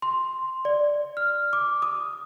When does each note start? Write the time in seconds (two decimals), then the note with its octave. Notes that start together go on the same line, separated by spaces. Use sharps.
0.02 C6
0.65 D5
1.17 F6
1.53 D6
1.82 D#6